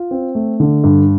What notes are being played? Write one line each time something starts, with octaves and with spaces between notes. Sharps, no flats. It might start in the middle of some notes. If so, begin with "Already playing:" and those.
Already playing: F4
C4
A3
D3
G2